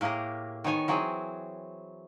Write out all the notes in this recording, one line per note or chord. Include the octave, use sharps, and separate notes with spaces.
A2 A#3 G4 G#4 A#4
D#3 B3 C#5 G#5
E3 F#3 C4 G#4